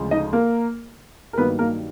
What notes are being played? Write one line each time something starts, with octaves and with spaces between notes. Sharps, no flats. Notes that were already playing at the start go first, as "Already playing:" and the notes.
Already playing: D2 C#3 F3 G#3
D#4 D#5
A#3 A#4
A#4
G2 D#3 F#3 A#3 B3 B4
A#3 A#4